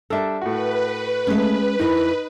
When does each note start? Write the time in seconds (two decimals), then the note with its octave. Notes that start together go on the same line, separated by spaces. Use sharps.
0.10 G3 D4 A4 A#4 E5
0.41 A2 F#4 B4
1.27 G#3 A3 C#4
1.79 F2 D#4 E4 A#4